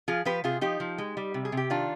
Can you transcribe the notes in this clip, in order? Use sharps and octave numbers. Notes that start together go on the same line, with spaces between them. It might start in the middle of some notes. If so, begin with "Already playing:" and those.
F3 F4 G#4
F3 G4 B4
C3 F4 G#4
F3 D#4 G4
F3
G#3
G3
C3
G#4
C3
G4
D#3 D4 F4